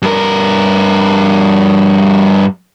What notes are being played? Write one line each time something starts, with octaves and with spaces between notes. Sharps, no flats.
G2 A#4